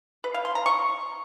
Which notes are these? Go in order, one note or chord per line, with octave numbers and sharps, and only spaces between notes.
B4
F5
C6
A#5
C#6